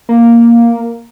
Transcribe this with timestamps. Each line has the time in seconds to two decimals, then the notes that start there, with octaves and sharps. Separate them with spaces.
0.09 A#3